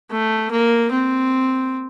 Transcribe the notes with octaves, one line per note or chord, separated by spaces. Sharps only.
A3
A#3
C4